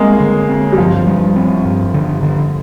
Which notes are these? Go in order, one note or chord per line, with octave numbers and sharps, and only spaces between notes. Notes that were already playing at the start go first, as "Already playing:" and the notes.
Already playing: G3 G#3 A#3 C4
D3
C4
G3
G2 F3
G3
C4
G2
D3
D3